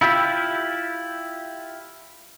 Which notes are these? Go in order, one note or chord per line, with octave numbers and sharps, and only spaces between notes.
E4 F4 G4 E5